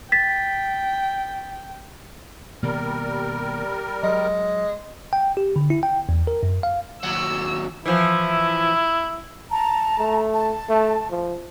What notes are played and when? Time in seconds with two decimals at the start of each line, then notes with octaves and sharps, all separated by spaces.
0.12 G5 A6 B6
2.63 B2 D#3 G3 A#3 A#4
4.03 F#3 G#3
5.13 G5
5.37 G4
5.56 D3
5.70 E4
5.83 G5
6.09 E2
6.27 A#4
6.43 F#2
6.63 F5
7.03 D#2 F#3 E6
7.86 E3 F3 E4
9.50 A5 A#5
9.99 A3
10.35 A5
10.69 A3
11.10 F3